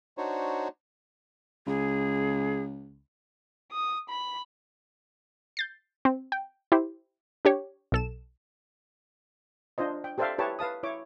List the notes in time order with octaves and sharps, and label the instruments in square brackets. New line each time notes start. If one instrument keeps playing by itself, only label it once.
[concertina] D4 D#4 F#4 C5 C#5
[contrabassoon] C#2 [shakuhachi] G#4
[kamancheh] D#6
B5
[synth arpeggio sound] G6 A6 C7
C4
G5
E4 G4 C5
D4 G4 C#5
B1 A4 E7
[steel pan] D4 F4 C5 D#5
G5
G4 A4 C5 D5 E5 F5
E4 G4 B4 C#5 A5
B4 F5 A5 D#6
E4 C#5 D6